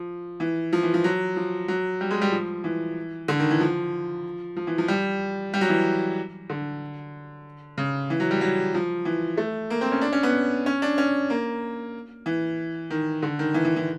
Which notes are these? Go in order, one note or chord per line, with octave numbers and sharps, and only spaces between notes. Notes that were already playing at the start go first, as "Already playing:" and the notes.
Already playing: F3
E3
F3
E3
F3
F#3
F3
F#3
G3
G#3
G3
F3
E3
D3
D#3
E3
F3
F3
E3
F3
G3
G3
F#3
E3
D3
C#3
E3
F#3
G3
F#3
F3
E3
A3
A#3
C4
C#4
D4
C#4
B3
C#4
D4
C#4
A#3
E3
D#3
D3
D#3
E3
E3
E3